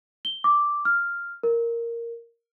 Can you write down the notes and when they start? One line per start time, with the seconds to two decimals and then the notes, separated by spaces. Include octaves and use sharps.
0.25 G7
0.44 D6
0.85 F6
1.43 A#4